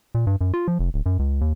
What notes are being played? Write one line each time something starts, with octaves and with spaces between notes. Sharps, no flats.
A#2
G2
F#2
F4
F3
F1
D1
F#2
C#2
D#2